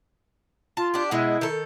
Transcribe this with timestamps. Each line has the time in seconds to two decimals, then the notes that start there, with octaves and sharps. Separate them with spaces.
0.77 F4 A5
0.94 D4 G4
1.11 B2 G#3 E4
1.41 D#3 A4